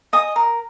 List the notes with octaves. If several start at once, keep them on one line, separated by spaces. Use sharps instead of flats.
D#5 G#5 D#6
A#4